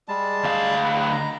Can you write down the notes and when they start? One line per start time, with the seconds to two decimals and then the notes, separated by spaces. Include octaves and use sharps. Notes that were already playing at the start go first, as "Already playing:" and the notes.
0.08 G3 G#3 A5
0.44 D2 F5
0.82 F#5
1.12 A#5